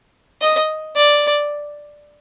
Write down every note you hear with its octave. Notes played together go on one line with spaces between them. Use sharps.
D#5
D5